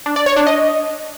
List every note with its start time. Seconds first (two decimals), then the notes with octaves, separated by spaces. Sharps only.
0.06 D4
0.16 D5
0.26 C#5
0.36 D4
0.47 D#5